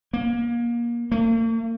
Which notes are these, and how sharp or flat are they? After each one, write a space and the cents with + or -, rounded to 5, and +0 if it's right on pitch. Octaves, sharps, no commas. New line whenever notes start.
A#3 +25
A#3 -45